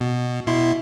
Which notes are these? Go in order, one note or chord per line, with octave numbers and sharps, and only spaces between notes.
B2
B2 E4 C6